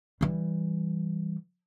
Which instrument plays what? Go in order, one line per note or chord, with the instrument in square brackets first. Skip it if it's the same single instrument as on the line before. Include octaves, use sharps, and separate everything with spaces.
[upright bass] E3 G3